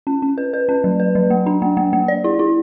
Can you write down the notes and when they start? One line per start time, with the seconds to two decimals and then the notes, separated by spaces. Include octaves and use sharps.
0.07 C#4
0.22 C#4
0.38 B4
0.54 B4
0.69 C#4
0.84 F#3
1.00 B4
1.15 F#3
1.30 A#3
1.46 D4
1.62 A#3
1.77 A#3
1.93 A#3
2.08 D5
2.24 E4
2.39 E4